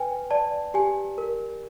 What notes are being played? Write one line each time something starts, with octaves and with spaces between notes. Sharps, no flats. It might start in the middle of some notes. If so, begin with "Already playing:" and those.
Already playing: B4 G5 G#5
D5 A5
G4 G#5
A#4